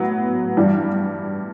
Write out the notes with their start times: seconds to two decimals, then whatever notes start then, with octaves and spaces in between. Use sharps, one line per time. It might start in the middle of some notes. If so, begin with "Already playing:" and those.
Already playing: A2 F#3 B3
0.57 G2 E3 G3